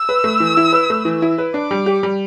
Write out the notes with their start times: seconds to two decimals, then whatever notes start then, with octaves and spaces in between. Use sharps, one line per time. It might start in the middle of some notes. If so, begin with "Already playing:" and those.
Already playing: E6
0.09 B4
0.24 A3
0.40 E3
0.57 E4
0.73 B4
0.90 A3
1.05 E3
1.22 E4
1.38 B4
1.54 D4 D6
1.71 G3
1.86 G4
2.03 G3